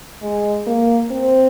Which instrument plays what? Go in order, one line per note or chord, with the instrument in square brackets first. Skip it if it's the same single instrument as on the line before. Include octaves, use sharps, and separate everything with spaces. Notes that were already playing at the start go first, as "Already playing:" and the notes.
[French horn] G#3
A#3
C4